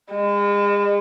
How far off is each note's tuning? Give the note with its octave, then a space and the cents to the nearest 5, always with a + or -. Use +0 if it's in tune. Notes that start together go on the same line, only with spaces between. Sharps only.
G#3 -40